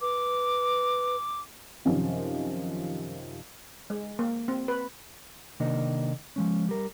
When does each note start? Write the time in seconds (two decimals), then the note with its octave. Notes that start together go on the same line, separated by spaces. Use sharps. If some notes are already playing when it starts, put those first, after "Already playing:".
0.01 B4 D6
1.85 F#2 C3 D#3 F3 C#4
3.90 G#3
4.19 A#3
4.48 C4
4.68 B4
5.60 C3 D#3 A#3 D4 D#5
6.36 F3 G#3 C#4
6.69 G3 A#4